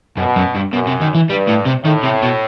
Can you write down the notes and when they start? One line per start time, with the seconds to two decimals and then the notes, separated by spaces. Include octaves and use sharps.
0.17 F#2 B2
0.36 F#2
0.55 G2
0.73 F#2 B2
0.87 C3
1.01 D#3
1.15 E3
1.29 G2 G3
1.48 A2
1.66 C3
1.85 A2 D#3
2.04 C3
2.23 B2